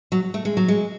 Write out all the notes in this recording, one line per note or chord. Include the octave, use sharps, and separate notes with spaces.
F#3
A3
G#3
F#3
G#3